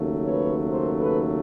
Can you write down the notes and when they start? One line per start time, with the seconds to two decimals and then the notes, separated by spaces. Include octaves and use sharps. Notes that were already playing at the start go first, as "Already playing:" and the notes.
Already playing: D#2 C#3 F#3 A3
0.25 B4 C#5
0.69 A#4 C5
0.98 A4 B4